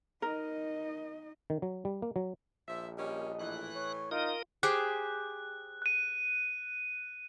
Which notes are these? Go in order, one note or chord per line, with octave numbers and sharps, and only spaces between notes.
D#4 A#4 D#5
D#3
F#3
G3
A#3
F#3
A#1 F3 E5
G3 A#3 C#4 D#5
A2 E3 F#6
C#5
D#4 F4 A#4 D#6
G4 G#4 C5 F#6
F#6 D#7